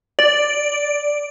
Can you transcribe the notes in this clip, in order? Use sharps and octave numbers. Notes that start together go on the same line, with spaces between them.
D5